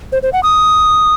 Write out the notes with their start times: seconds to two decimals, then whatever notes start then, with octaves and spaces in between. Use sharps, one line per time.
0.12 C5
0.23 C5
0.33 F#5
0.43 D#6